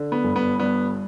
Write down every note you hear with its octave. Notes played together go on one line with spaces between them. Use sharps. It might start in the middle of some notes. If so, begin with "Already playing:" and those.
Already playing: D3
B3
G1
B3
G2 B3